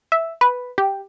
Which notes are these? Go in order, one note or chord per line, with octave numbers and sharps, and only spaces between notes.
E5
B4
G4